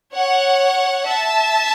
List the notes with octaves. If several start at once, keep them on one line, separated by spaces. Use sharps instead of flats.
C#5 F#5
E5 A5